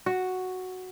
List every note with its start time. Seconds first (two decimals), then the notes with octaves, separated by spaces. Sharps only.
0.06 F#4